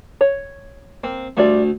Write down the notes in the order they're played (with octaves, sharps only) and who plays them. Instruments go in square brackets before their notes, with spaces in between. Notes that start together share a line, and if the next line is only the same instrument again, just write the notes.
[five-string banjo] C#5
[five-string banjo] A#3 [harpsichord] C4
[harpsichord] D2 A3 [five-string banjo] G3 F4 D5